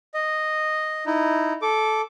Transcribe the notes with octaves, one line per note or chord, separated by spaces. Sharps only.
D#5
D#4 E4
A4 D6